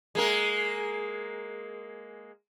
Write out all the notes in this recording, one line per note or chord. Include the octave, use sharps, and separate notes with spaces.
G#3 A#3 A#4